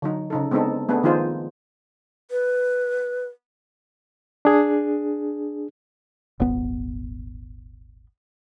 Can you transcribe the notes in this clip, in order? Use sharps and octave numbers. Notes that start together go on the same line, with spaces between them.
D3 F#3 D#4
C#3 D#4 A4
G#3 B3 C4 D4 D#4 A4
A3 B3 D4 G#4 A4
D#3 F3 D#4 F4 G#4 C5
B4
D4 G#4
D#1 G#1 B3